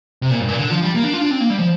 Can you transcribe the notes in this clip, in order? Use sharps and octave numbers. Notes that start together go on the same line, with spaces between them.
C3
A#2
G2
A#2
D3
F3
G3
A#3
D4
F4
D4
C4
A#3
G3
F3